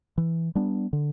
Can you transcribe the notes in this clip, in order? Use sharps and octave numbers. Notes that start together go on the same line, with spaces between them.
E3
G3 B3 D4
D3